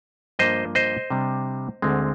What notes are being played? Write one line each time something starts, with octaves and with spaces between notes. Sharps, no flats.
G2 F3 A#3 D4 C5 D#5
C5 D#5
C3 G3 D4
D2 D3 G#3 C4